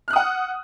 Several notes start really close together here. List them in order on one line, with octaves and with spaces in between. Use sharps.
F6 F#6 D#6 F#5